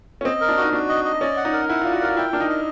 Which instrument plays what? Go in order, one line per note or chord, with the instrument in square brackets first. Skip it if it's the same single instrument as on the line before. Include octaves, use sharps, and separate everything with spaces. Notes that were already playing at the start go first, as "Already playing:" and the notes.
[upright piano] C#4
[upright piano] C4 [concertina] D#5
[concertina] A#4
[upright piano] D4
[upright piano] D#4 [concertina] F#4
[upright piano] D4 [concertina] F#4
[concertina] D#5
D#5
[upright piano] C#4 [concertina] D5
[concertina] F#5
[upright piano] D#4
[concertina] A#4
[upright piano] E4 [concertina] F#5
[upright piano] F4
[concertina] D5
[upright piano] F#4
[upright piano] F4 [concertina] A#4
[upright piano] E4 [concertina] G5
[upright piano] D4 [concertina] A#4
[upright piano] D#4
[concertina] D#5